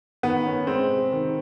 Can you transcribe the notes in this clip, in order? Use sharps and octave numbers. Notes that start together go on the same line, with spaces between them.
D#3 B3
C#4
G#3 C4
C3
D#3